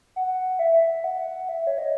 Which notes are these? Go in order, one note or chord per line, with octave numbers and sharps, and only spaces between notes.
F#5
E5
F#5
E5
C#5
D#5